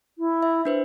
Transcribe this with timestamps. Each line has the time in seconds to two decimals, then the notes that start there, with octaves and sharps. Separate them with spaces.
0.18 E4
0.43 E5
0.65 D4 B4 C5